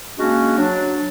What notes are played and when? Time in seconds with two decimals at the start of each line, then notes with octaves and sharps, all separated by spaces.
0.19 G#3 A#3 C#4 D4 F#4
0.58 F#3 D4